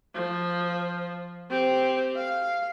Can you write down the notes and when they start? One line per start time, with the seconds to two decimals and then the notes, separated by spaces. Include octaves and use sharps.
0.14 F3
1.50 C4 G4
2.16 F5